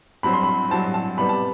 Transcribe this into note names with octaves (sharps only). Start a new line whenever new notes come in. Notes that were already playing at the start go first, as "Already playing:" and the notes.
G2 F#3 C4 B5
C6
B5
G2 F#3 C4 A5
A5
C3 G3 B3 B5
A5